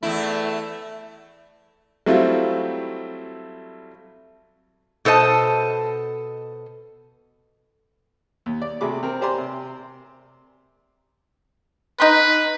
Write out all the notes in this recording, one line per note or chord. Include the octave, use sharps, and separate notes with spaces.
E2 A3 E4
F#3 G3 A3 C4 E4 F4
B2 A4 C5 D#5 A5
D#2
D5
C3 A3 F#4 G#4 B5 D6
C4 A#4
G4 C5 D5 G#5 A#5 C6
C3
D#4 B4 C6